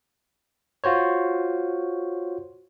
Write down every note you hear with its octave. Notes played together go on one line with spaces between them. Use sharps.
F4 F#4 C5 C#5